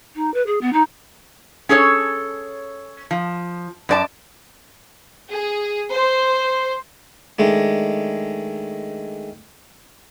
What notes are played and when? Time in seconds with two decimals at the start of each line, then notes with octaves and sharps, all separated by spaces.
0.15 D#4
0.34 B4
0.46 G#4
0.61 B3
0.73 D#4
1.69 C#4 G#4 A4 C#5
3.11 F3
3.89 F#2 D5 A5
5.30 G#4
5.92 C5
7.39 D#3 G#3 A3 D4